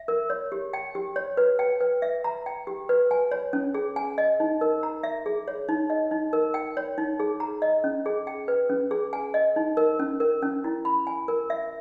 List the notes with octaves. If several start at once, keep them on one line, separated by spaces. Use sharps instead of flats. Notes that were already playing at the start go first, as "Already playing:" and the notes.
Already playing: E5
A#4
C#5
G4
G5
G4
C#5
B4
G5
B4
E5
A#5
G5
G4
B4
G#5
C#5
C#4
G#4
G#5
D#5
D#4
A#4
A#5
E5
G#4
C#5
D#4
D#5
D#4
A#4
G5
C#5
D#4
G#4
A#5
D#5
C#4
G#4
G5
B4
C#4
G#4
G#5
D#5
D#4
A#4
C#4
A#4
C#4
E4
B5
G#5
A#4
E5